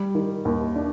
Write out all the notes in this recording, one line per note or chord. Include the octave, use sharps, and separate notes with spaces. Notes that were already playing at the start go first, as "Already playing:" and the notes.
Already playing: G3
D#3
D#2
D4